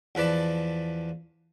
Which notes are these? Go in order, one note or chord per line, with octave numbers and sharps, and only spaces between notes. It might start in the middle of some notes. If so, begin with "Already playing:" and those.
E2 F3 B4 D5 A5